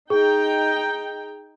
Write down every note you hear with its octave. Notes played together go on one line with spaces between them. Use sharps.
D#4 G#4 G5